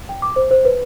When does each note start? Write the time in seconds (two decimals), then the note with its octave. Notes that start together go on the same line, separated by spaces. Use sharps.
0.09 G5
0.22 D6
0.36 C5
0.51 C5
0.65 B4